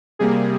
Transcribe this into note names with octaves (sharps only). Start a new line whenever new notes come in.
C3 G3 A#3 G#4